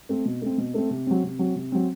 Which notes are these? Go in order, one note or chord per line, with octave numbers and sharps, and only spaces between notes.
A3 C4
B2
A3 C4
B2
A3 C4
C3
F#3 C4
C3
F#3 C4
C3
F#3 C4